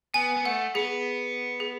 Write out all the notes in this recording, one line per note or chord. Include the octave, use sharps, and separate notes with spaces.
B3 G#5
B3
A3 F#5
B3 G#4
G#4